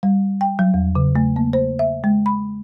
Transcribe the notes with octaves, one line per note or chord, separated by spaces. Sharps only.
G3
G5
F#3
E2
C#3
A3
A#3
C5
E5
G#3
B5